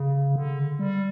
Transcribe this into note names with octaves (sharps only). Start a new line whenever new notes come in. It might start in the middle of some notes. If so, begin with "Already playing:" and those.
Already playing: C#3
D3
G3